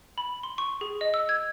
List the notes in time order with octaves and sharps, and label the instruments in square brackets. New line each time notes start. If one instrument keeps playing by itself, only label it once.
[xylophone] B5
C6
C#6
G#4
D#5
E6
G#6